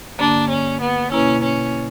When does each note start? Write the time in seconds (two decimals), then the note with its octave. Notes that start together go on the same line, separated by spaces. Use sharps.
0.19 G2 D3 A#3 D4
0.50 C#4
0.81 B3
1.12 B2 A#3 C#4 E4
1.43 C#4